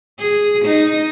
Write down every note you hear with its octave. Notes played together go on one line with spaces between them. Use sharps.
G#4
D#4